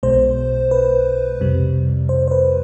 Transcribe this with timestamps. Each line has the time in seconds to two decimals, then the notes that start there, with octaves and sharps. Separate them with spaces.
0.03 B1 B2 G#3 C5
0.71 B4
1.40 F2 C3 G3
2.09 C5
2.28 C5
2.31 B4